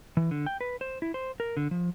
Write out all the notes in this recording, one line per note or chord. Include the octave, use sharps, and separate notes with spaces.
E3
D3
G5
B4
C5
E4
C5
A#4
D3
F3